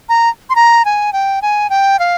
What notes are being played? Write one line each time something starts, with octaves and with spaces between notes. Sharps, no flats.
A#5
C6
A#5
G#5
G5
G#5
G5
F5